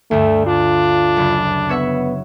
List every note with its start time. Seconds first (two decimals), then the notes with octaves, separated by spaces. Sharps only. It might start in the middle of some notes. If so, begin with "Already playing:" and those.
0.11 D2 G2 A3
0.47 D4 F4
1.17 F#1
1.69 B3 C#5 E5 F#5